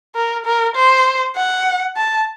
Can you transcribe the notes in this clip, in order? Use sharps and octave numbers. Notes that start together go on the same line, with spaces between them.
A#4
A#4
C5
F#5
A5